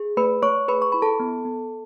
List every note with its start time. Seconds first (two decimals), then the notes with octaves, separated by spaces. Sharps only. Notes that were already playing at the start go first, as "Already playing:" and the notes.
Already playing: G#4
0.17 A3 B4 B5
0.42 A3 C#5 C#6
0.68 G#4 B4 B5
0.82 C#6
0.92 E4 B5
1.02 A4 A5
1.20 B3
1.45 B3